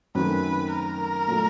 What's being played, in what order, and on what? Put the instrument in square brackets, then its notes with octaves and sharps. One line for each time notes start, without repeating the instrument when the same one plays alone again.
[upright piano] F#2 D#3 F#3 A3 C4 [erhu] B4
[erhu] A#4
[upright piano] A#2 F#3 A3